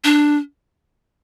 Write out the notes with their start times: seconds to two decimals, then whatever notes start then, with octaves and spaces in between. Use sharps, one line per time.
0.04 D4